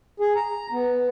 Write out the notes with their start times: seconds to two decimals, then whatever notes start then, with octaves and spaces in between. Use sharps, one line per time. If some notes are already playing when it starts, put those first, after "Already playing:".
0.20 G#4
0.36 A#5
0.72 B3